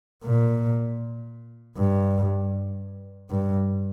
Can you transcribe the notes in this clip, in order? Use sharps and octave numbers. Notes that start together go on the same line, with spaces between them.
A#2
G2
G2